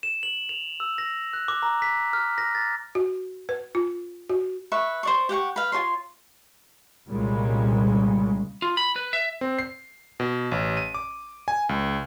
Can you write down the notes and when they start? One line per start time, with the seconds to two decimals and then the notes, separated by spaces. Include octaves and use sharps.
0.03 E7
0.23 F#7
0.49 F7
0.80 E6
0.98 A#6
1.33 F#6
1.48 D6
1.63 A#5
1.82 B6
2.13 F6
2.38 A#6
2.55 A6
2.95 F#4
3.49 B4
3.75 F4
4.29 F#4
4.72 B4 E5 C#6
5.03 C5 D5 C#6
5.29 G4 F#5 G5 C#6
5.56 B4 F5
5.72 F4 G#4 C#5 C6
7.07 C2 A#2 C#3 G3 G#3
8.62 F4
8.77 B5
8.96 B4
9.13 E5
9.41 C4
9.58 C7
10.20 B2
10.52 A1
10.77 D#7
10.95 D6
11.48 G#5
11.69 C#2